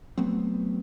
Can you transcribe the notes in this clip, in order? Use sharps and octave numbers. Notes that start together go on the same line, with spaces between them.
F#3 A3 B3 C4